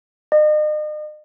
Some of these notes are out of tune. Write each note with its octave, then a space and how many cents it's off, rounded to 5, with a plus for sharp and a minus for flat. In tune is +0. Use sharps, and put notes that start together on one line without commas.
D#5 -40